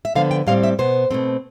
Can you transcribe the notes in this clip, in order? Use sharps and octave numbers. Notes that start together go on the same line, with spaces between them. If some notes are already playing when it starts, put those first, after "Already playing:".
E5
D3 F3 B3 F5
G5
A2 G3 C4 F5
E5
B2 B3 C5
B2 A3 C4